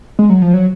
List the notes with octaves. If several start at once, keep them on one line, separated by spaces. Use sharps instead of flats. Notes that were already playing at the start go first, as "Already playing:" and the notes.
G#3
F#3
F3
F#3